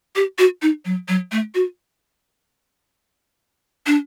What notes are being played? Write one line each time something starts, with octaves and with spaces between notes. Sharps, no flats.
G4
F#4
D#4
F#3
F#3
A3
F#4
D4